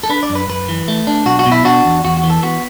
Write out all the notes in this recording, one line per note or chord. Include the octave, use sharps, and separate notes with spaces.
A4
D4 B4
D5
F#2
B4
F#2 B4
E3
A3
D4
B1 F#4
F#4
B2
E4
D4 F#4
E2
E2 F#4
F#4
E3
A4
B3 F#4